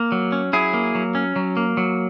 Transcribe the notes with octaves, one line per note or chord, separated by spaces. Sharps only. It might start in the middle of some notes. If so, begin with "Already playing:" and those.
Already playing: A#3
F#3
C#4
F#3 E4 G#4
A#3
F#3
C#4
F#3
A#3
F#3